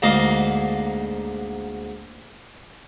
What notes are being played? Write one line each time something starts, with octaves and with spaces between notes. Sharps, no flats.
D2 G#2 A#3 D#5 F5